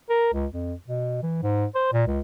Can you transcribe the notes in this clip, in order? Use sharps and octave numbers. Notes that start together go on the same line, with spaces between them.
A#4
C#2
F2
B2
E3
G#2
C5
A#2
C#2